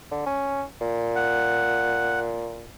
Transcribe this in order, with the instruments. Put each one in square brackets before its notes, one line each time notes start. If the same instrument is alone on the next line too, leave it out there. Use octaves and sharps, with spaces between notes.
[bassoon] D3
C#4
A#2
[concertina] F#5